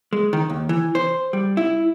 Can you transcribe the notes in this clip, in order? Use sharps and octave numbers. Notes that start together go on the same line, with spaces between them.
G#3
D#3
D#2
E3
C5
G3
E4